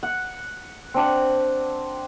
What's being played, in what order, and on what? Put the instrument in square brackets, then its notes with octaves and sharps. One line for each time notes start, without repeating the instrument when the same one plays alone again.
[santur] F#5
C4 D4 F#5